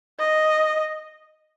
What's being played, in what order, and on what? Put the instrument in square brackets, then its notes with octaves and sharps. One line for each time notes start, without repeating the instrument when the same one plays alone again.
[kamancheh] D#5